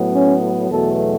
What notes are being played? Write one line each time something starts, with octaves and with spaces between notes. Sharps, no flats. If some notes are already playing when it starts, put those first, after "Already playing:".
Already playing: A2 F#3 B3
C#4
E2 B2 F#3 A3 A4